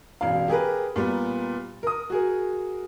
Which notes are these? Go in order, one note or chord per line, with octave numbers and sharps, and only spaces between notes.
E1 A1 F5
G4 G#4 A#4 B4
A#2 G3 B3
A#4 D#6
F#4 G#4 A#4